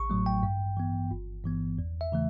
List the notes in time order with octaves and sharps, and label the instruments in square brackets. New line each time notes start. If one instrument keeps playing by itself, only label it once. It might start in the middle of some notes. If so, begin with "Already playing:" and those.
Already playing: [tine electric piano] A1 C#6
A2 F#3 A3
G5
G2
E3 B3
G1
G2 E3 B3
E2
E5
C#3 E3 A3